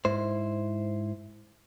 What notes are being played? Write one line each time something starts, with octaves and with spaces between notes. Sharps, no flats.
G#2 E4 C5